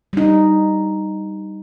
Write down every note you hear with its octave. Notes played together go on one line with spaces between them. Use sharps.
G3 D#4